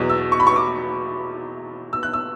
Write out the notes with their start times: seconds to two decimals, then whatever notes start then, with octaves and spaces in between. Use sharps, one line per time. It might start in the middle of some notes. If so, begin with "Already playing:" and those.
Already playing: E2 B2 F#3
0.10 E6
0.32 C#6
0.40 B5
0.47 C#6
0.56 D6
1.93 E6
2.03 F#6
2.13 E6